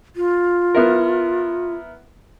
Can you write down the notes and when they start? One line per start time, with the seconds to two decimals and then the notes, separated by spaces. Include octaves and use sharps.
0.16 F4
0.75 B3 E4 A#4